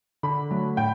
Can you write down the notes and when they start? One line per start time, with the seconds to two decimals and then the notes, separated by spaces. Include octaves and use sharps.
0.23 D3 B5
0.51 F#3 A3
0.77 A2 G5